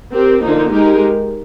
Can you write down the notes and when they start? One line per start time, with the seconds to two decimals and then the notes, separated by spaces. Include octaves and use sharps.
0.13 C4 G4 A#4
0.42 D3 F3 A#3 D#4
0.71 G#3 D#4 G4 A#4